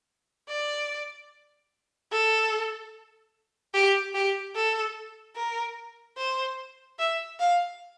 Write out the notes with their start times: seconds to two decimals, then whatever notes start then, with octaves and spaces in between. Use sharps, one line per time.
0.49 D5
2.12 A4
3.74 G4
4.14 G4
4.55 A4
5.36 A#4
6.17 C5
6.99 E5
7.40 F5